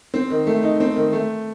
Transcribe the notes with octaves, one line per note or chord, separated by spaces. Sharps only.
C4
D#3
A3
D#4
C4
D#3
A3